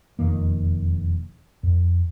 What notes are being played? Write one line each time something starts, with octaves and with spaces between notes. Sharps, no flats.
E1 F2 D#3 A#3
F2